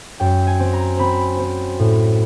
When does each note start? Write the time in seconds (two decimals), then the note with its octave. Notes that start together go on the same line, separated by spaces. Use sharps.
0.20 F#2 G5
0.47 G#5
0.60 C4
0.73 A#5
0.99 C4 B5
1.39 C4
1.79 A2